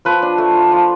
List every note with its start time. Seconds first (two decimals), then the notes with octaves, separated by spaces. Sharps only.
0.05 F3 B4
0.22 D4
0.38 A3
0.55 F4
0.72 F3